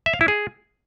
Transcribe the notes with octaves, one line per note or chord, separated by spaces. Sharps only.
E5
F5
E4
G#4